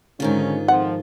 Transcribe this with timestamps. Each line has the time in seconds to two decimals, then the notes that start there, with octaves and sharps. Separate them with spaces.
0.20 G#2 D3 D#3 G#3 C#4 F4
0.68 F2 F3 F#5